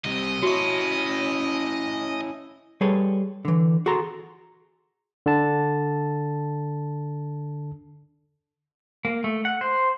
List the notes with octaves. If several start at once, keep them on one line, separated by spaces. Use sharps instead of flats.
C2 C3 D#5
C#4 E4 F#4 C#6
G3 G#4 A4 B4 C#5
D3 E3
F#4 G#4 A4 A#5 C6
D3 A5
A#3
A3
F#5
C5